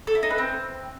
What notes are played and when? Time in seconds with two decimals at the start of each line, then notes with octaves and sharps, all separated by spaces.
0.07 A4
0.15 E4
0.23 D#4
0.30 B4
0.38 C4